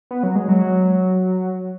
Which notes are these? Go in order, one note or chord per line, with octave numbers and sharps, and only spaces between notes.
B3
F#3
G#3
F#3